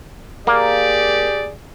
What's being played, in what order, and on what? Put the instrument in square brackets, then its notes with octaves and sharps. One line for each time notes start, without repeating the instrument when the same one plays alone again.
[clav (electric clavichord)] A#3 [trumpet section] G4 G#4 D5